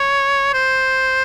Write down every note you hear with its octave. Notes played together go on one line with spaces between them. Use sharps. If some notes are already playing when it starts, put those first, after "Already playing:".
Already playing: C#5
C5